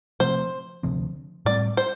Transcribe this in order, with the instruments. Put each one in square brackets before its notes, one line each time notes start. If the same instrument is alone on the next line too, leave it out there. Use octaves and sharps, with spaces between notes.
[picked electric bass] C3 F3 A3 C4 [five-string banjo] C5
[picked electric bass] D2 C3 F3 C4
[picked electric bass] A2 G3 C4 [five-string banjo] D5
[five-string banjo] C5